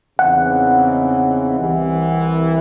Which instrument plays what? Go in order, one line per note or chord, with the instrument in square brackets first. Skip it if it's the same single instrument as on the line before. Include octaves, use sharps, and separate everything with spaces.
[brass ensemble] E2 C#3 E3 C4 D#4 [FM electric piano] F#5
[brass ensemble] C2 C3 E3